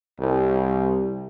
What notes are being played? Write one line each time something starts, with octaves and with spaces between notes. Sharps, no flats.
C2